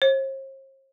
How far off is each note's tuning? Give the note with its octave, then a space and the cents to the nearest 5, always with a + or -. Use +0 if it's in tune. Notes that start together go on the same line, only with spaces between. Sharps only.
C5 +45